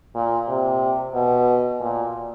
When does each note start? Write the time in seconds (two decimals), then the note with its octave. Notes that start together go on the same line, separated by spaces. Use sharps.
0.15 A#2
0.48 C3
1.14 B2
1.80 A#2